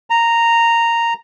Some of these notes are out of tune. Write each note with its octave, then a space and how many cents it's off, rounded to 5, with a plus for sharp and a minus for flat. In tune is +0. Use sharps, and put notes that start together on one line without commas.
A#5 -10